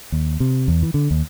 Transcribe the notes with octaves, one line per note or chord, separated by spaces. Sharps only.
D#2
C3
E2
E3
D3
D#2